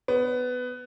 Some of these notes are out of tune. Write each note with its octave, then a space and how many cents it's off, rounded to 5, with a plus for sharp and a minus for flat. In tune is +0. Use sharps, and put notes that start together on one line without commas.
B3 +15